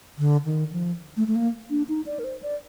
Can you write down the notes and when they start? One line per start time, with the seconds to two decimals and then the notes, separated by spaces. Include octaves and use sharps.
0.18 D3
0.45 D#3
0.72 F3
1.17 A3
1.27 A3
1.35 A#3
1.70 D4
1.89 D#4
2.06 D5
2.19 A#4
2.24 C5
2.43 D5